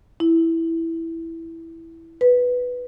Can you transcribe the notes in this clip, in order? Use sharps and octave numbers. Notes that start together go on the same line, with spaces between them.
E4
B4